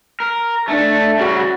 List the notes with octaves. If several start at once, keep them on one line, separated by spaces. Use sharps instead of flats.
A#4
A3 D4
C#3 G3 F#4